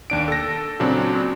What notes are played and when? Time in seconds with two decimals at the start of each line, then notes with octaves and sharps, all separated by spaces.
0.10 D#2 D4 D7
0.28 A4 A#6
0.80 A#2 C#3 F#3 C4 D4